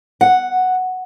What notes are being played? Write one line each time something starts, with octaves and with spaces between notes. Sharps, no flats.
F#5